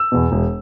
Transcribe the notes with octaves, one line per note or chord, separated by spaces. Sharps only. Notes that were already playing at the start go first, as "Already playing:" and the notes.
Already playing: E6
E2 B2
E1